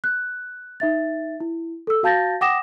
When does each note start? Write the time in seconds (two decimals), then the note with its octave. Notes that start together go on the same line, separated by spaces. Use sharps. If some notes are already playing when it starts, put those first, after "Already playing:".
0.04 F#6
0.80 D#4 E5 A6
1.40 E4
1.87 A4 E6
2.03 F#4 F5 A5 G6 A6 A#6
2.41 F#5 G5 D6 D#6 A#6 E7